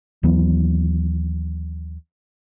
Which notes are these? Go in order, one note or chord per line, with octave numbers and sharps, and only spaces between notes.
D#2 E3 F#3 B3